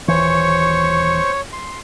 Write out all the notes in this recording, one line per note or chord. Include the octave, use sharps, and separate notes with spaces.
D#1 E3 C5 C#5 C#6
C6